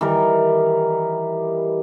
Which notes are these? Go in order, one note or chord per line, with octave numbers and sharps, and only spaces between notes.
D#3 E3 G3 A#4